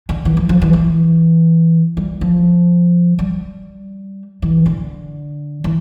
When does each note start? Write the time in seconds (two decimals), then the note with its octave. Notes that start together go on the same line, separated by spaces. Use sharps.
0.09 D3
0.25 E3
0.37 F3
0.49 F3
0.62 E3
0.73 E3
1.97 G3
2.21 F3
3.19 G3
4.42 E3
4.66 D3
5.64 E3